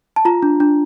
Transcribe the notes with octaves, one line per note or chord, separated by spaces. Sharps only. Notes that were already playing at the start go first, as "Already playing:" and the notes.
A5
F4 A#5
D4
D4